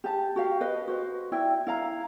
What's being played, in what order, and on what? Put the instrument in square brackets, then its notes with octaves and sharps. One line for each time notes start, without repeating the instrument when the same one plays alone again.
[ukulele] G4 A5
F#4 G4 F5
B4 D#5
F#4 C5
E4 D5 E5 G5
E4 F5 A#5